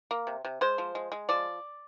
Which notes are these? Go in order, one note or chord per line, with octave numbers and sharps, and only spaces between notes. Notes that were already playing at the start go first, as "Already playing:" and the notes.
A#3
C3
C3
G#3 C5
F3
G#3
G#3
F3 D5